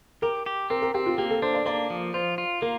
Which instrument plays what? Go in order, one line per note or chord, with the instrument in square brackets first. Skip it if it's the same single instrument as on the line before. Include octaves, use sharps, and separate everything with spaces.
[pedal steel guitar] G4 [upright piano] A#4
[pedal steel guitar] G4
[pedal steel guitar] C4 [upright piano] A#4
[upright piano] A#4
[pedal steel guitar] C4 [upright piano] G4
[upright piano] F4
[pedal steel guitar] A#3 [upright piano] G4
[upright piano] A4
[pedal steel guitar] D4 [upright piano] C5
[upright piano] D5
[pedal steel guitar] A#3 [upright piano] D5
[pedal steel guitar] F3
[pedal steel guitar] F4 [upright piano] C5
[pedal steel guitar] F4
[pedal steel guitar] A#3 [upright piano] A#4